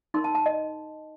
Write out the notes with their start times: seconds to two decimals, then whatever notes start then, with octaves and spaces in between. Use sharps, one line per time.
0.14 D#4 A#4 C6
0.24 A5
0.35 A5
0.46 D#5